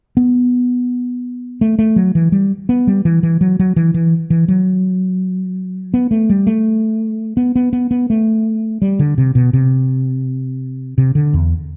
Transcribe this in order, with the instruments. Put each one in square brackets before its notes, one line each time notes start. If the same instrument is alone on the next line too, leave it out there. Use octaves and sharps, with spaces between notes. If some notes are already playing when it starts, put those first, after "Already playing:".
[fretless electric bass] B3
A3
A3
F#3
E3
G3
B3
G3
E3
E3
F#3
F#3
E3
E3
E3
F#3
B3
A3
G3
A3
B3
B3
B3
B3
A3
G3
D3
C3
B2
C3
C3
D3
E2